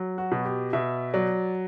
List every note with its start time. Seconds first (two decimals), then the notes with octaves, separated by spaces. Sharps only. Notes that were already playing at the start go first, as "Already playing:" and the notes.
Already playing: F#3
0.18 F#4
0.32 B2
0.45 G4
0.73 B2 E5
1.13 F#3 D5